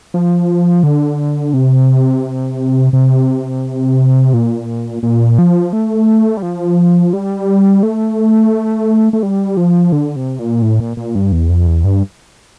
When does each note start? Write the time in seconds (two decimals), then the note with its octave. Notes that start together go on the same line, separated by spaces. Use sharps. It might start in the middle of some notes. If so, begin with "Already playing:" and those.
0.14 F3
0.83 D3
1.54 C3
2.93 C3
4.34 A#2
5.03 A#2
5.39 F3
5.73 A3
6.37 G3
6.42 F3
7.13 G3
7.83 A3
9.13 A3
9.23 G3
9.57 F3
9.92 D3
10.16 C3
10.39 A#2
10.62 A2
10.80 A#2
10.97 A#2
11.15 G2
11.32 E2
11.49 F2
11.67 E2
11.84 G2